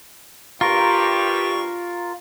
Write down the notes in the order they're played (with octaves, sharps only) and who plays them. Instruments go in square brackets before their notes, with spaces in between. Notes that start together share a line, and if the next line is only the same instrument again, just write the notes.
[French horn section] G2 G4 [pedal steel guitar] F4 A#4 [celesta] A#5 [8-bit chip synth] C#6